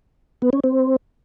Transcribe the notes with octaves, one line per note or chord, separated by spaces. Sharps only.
B3
C#4
C4